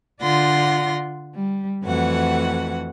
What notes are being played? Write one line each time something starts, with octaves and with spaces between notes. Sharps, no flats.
D3 F4 D5 F#5 C6 A#6
G3
F2 E3 A3 F#4 F#5